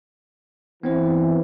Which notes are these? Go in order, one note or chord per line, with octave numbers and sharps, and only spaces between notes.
E3 B3 C4 C5